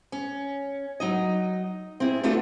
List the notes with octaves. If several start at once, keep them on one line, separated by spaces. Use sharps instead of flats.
C#4
F#3 D#4 D#5
C4 E4 G#4
A3 B3 D4 F4 F#4 A4